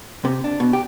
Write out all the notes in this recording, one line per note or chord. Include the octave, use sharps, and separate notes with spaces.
C3
D4
B2
G4